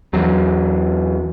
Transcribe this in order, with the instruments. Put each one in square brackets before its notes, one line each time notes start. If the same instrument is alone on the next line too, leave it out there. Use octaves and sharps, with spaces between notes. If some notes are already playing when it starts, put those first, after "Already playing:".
[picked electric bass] E2 F#3